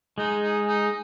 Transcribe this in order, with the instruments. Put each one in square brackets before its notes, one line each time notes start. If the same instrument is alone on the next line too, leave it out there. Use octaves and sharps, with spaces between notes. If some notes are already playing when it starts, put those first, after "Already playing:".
[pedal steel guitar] G#3 [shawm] D#4
[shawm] D#4
D#4